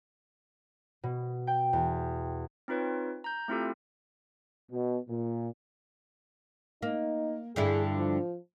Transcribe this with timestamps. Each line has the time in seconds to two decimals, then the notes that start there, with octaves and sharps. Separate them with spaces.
1.04 B2
1.47 G5
1.73 E2
2.68 C4 D#4 F4 B4 C#5
3.24 A#5 G6
3.48 A3 C4 E4 F4 G4 A4
4.71 B2
5.09 A#2
6.82 A#3 D#4
7.56 G2 D3 E4 G#4
7.96 F3